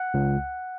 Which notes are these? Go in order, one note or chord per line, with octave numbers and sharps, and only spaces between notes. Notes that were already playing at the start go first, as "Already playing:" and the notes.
Already playing: F#5
C#2